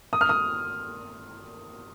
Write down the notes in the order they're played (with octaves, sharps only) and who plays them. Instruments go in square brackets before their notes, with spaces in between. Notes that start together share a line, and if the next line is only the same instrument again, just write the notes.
[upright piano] D#6
F6
D#6